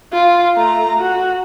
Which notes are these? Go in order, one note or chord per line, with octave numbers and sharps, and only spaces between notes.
F4
A3 A#5
F#4